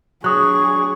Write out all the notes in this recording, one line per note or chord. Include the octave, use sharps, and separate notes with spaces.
F#3 D4 G#4 C#6 D#6 F#6